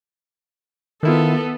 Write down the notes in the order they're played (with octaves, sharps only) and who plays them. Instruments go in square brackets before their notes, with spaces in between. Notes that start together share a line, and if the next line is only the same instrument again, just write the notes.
[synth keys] D#3 E4 F4 [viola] B3 A4